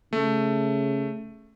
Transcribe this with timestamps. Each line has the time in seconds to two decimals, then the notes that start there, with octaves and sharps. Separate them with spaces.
0.13 C#3 A3